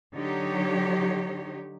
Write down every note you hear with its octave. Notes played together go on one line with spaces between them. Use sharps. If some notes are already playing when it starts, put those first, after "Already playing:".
D3 F#3 D#4 G4 C#5